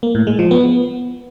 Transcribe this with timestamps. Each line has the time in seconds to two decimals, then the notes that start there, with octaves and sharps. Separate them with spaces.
0.03 A#3
0.15 A2
0.27 G#3
0.39 F3
0.51 B3